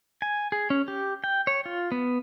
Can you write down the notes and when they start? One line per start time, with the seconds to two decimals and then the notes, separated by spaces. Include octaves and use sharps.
0.22 G#5
0.52 G#4
0.70 C#4
0.88 G4
1.24 G5
1.47 C#5
1.66 F4
1.92 B3